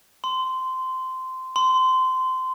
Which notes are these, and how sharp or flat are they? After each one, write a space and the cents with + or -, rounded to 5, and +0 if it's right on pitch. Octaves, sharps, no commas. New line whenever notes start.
C6 -15
C6 -20